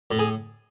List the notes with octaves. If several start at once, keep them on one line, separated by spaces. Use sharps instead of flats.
A2
G#4